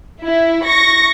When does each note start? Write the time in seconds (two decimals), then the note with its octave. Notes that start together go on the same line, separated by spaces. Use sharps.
0.23 E4
0.65 C#6 A#6